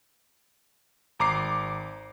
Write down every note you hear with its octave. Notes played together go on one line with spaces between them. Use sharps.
G#1 A#5 D6 C7